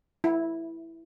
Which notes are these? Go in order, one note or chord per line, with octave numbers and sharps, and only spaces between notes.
E4